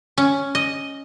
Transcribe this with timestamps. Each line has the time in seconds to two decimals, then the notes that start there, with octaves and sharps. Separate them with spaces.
0.18 C#4
0.55 D#5